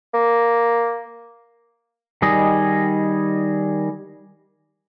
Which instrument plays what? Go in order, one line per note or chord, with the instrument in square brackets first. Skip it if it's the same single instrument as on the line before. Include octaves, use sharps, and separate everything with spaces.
[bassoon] A#3
[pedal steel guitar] D#3 G3 G#4 D#5